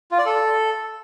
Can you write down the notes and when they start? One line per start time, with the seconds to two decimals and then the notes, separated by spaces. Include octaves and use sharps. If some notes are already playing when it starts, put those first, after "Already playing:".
0.11 F4
0.19 D5
0.26 A4